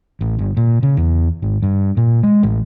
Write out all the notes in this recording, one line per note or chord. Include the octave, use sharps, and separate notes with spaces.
A1
G1
A#2
C#3
E2
G#1
G2
A#2
G#3
A1